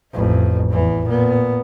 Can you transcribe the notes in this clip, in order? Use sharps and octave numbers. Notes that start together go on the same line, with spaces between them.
A1 F2
E2 E3
A#2 B3